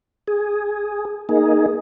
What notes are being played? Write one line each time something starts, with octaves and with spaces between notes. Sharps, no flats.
G#4
A#3 D#4 G#4